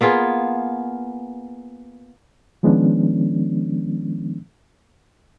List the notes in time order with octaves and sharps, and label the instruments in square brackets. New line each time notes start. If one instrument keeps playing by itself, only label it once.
[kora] A#3 B3 F4 G#4
[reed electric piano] D#3 F3 G#3 B3 C#4 D4